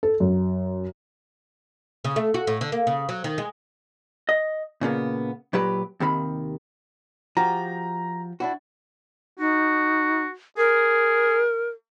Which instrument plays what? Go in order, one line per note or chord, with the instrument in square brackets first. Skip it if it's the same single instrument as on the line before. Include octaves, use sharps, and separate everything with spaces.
[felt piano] A4
F#2
[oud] C#3
A3
F#4
A2
D3
A#3
C#3
F#3
D#3
G#3
[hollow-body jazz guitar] D#5
A#2 C#3 A#3 B3
A#2 F#3 G4 B4
D#2 C3 D#3 B5
[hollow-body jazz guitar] F3 F#4 G4 [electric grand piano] A#5
[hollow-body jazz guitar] D4 E4 F#4
[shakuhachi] D#4 [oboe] F#4
[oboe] G#4 [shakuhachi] A#4